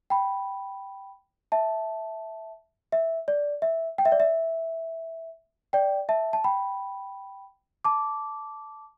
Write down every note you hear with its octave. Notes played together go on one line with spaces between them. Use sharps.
G5 B5
E5 A5
E5
D5
E5
G5
E5
D5
E5
D5 G5
E5 A5
A5
G5 B5
A5 D6